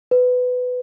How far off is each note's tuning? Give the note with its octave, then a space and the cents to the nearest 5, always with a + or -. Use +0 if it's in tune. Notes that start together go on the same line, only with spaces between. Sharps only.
B4 +15